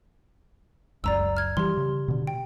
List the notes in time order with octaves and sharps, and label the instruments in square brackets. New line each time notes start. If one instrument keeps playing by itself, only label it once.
[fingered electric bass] F#1 C#2 F#2 [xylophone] D5 A#5 E6
[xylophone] F6 G#6
[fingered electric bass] E3 G3 [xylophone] G4 C6
[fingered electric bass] C#3
B2 D3
[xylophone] G5